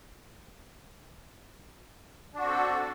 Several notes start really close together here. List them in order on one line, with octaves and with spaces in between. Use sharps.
D4 F#4 C4 A4